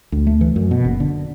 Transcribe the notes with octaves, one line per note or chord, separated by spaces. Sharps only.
D2
A3
E3
F#2
B2
F#1
D3